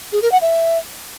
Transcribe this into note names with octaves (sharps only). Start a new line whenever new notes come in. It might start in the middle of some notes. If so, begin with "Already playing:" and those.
G#4
A#4
F#5
E5